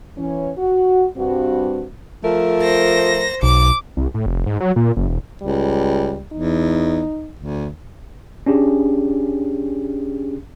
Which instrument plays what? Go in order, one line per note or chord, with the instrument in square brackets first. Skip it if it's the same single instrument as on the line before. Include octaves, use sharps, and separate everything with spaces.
[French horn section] E3 C#4
F#4
G2 C4 F#4
[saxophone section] F3 A3 A#4
[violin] C5 A#6
[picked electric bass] B1 [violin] D6
[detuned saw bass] C2
A2
F1
G#2
F#3
A#2
F#1
E1
[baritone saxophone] C#2 [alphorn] G3
[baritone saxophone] E2 [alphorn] D#4
[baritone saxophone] D2
[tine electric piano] C#4 D4 G4 G#4